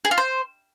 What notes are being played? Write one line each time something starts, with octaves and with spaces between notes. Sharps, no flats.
G#4
F4
C5